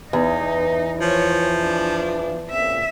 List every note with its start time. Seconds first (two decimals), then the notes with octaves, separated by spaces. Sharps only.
0.13 E2 E3 D#4
1.01 F3 C#5
1.59 D4
2.51 C#2 A#2 C4 E5